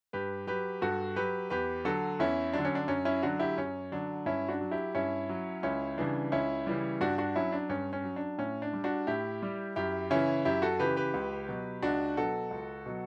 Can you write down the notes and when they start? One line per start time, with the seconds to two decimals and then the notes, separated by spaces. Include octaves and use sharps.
0.13 G2 G4 B4
0.47 F#3 G4 B4
0.82 G2 F#4 A4
1.16 F#3 G4 B4
1.50 E2 G4 B4
1.85 D3 F#3 F#4 A4
2.19 E2 C#4 E4
2.53 D3 F#3 D4
2.65 C#4
2.75 D4
2.88 F#2 C#4
3.05 C#4 E4
3.22 D3 F#3 D4 F#4
3.39 E4 G4
3.58 F#2 C#4
3.92 D3 F#3 D4
4.26 G2 C#4 E4
4.48 D4 F#4
4.61 F#3
4.71 E4 G4
4.95 G2 C#4 E4
5.29 F#3
5.63 C#2 C#4 E4
5.98 C#3 E3 G3 D4
6.32 C#2 C#4 E4
6.67 C#3 E3 G3
7.01 G2 D4 F#4
7.18 D4 F#4
7.36 F#3 C#4 E4
7.52 D4
7.69 G2 C#4
7.93 C#4
8.04 F#3
8.16 D4
8.38 A2 C#4
8.62 D4
8.73 G3
8.84 D4 F#4
9.07 A2 E4 G4
9.42 G3
9.76 F#2 E4 G4
10.10 C#3 E3 C#4 E4
10.45 F#2 E4 G4
10.62 F#4 A4
10.79 C#3 E3 G4 B4
10.96 G4 B4
11.14 C#2
11.48 B2 F#3
11.82 C#2 D4 F#4
12.17 B2 F#3 F#4 A4
12.51 C#2
12.86 B2 F#3